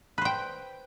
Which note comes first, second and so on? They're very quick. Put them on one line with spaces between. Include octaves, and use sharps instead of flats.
B4 C5 G5